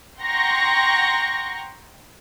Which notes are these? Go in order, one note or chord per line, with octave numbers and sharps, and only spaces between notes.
F#5 G5 A#5 C6 C#6 A#6